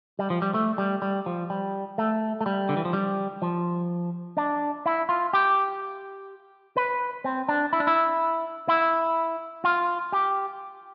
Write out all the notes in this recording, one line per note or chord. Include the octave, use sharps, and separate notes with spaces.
G3
F3
G3
A3
G3
G3
F3
G3
A3
A3
G3
D3
E3
F3
G3
F3
D4
E4
F4
G4
B4
C4
D4
E4
D4
E4
E4
F4
G4